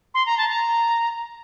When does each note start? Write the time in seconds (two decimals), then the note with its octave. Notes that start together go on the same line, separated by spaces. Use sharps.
0.14 C6
0.26 A#5
0.38 A5
0.49 A#5